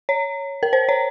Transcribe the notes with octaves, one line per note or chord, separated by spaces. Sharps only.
C#5
A#4
C5
C#5